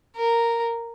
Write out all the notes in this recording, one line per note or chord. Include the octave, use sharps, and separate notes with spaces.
A#4